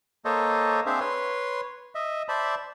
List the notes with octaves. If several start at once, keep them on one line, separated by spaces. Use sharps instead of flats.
A#3 A4 C5 C#5 D#5
C4 D4 G#4 C5 E5 F5
B4 C#5 C6
D#5 E5
C5 D5 E5 A5 B5